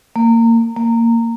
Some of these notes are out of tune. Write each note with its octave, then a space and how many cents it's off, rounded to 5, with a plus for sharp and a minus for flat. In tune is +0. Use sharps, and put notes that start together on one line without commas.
A#3 -25
A#3 -15